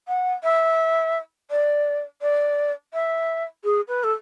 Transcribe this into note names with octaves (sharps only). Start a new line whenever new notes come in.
F#5
E5
D5
D5
E5
G#4
B4
A4